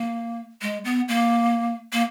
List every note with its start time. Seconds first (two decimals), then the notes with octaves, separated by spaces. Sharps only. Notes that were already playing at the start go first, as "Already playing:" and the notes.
Already playing: A#3
0.62 G#3
0.85 B3
1.08 A#3
1.93 A#3